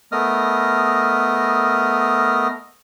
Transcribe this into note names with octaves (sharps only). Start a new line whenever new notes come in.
A3 B3 A#4 D#5 D#6 F6